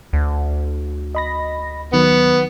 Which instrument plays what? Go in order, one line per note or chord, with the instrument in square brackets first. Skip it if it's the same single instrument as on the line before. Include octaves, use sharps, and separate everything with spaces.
[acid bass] D2
[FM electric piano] D#5 B5 A#6
[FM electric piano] D#3 F#3 [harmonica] B3